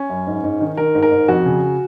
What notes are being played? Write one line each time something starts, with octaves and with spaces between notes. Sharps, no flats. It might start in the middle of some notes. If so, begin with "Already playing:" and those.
Already playing: C#4
F#2
G#2
G#2
D#3
D#3 A#4
G#2
A#4
G#2
F2 F#4
C#3